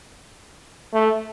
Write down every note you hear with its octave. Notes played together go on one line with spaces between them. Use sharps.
A3